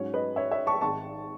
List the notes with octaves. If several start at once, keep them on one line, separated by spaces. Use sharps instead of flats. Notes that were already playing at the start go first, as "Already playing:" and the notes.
Already playing: G#2 F#3 C#4 C#5
B4 D#5
C#5 E5
C#5 E5
A5 C#6
G#1 G#2 D#3 A5 C#6